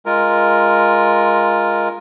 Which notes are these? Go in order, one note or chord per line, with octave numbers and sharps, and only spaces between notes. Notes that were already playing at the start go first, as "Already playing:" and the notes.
G#3 F4 A#4